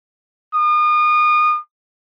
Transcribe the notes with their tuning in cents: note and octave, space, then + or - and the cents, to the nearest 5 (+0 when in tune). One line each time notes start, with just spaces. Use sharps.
D#6 -35